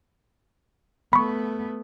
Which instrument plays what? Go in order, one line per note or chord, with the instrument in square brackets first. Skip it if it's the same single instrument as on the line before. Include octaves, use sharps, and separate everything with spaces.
[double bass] A3 B3 [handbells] B5 C#6